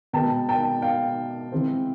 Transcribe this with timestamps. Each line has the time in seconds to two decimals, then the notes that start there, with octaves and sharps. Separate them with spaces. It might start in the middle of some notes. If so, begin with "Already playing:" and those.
0.13 B2 G#3 B3 G5 A5
0.49 G5 A5
0.82 F5 G5
1.52 C3 E3 G#3 C4